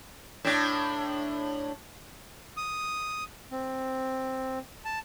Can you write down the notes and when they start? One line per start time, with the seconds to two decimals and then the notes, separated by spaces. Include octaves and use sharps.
0.45 A2 D4
2.57 D#6
3.52 C4
4.85 A5